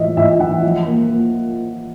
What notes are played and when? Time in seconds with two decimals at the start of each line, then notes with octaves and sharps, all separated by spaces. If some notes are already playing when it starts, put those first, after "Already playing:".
Already playing: A2 E3 D#5 E5
0.17 A2 E5
0.40 E3 F#5
0.63 F3
0.86 A#3
1.09 A#3